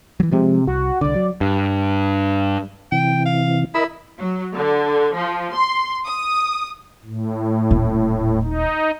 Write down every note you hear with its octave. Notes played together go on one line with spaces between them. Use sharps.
E3 F#3
C3 F3 G#3
C2 F#4
C2 D3 D5
F#3
G2
C3 E3 G5
F5
E4 A#4 D#5 B5
F#3
D3
F3
C6
D#6
A2
D#1
D#4